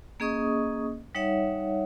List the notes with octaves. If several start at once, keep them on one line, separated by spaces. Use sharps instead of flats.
A#3 C#4 G#4 D#5 C#6 D#6
G3 D#4 C#5 E5 F#5